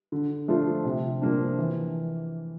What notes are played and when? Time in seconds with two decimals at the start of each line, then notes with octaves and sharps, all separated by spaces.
0.12 D3
0.48 F3 A3 D4 F4
0.85 C3
1.22 F3 A#3 D4
1.59 E3